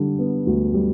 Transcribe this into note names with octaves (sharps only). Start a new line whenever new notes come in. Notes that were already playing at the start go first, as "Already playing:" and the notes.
Already playing: D3 G3
B3
D2
G3